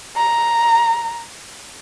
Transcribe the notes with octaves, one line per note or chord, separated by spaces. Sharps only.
A#5